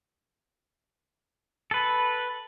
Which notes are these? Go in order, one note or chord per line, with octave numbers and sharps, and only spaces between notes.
A4 B4